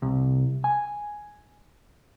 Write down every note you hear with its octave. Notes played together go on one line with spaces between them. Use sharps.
C2
G#5